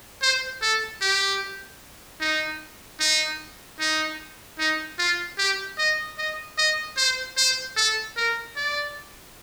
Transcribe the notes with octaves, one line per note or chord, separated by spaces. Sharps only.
C5
A4
G4
D#4
D#4
D#4
D#4
F4
G4
D#5
D#5
D#5
C5
C5
A4
A#4
D5